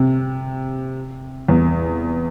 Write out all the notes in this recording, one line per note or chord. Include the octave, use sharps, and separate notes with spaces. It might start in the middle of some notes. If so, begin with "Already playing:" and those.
Already playing: C3
E2